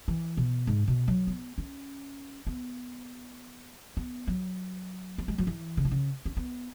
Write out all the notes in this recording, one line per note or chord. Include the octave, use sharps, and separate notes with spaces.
E3
B2
G#2
B2
F#3
B3
C#4
B3
B3
F#3
B3
G#3
F#3
E3
C#3
E3
C#3
C#4
B3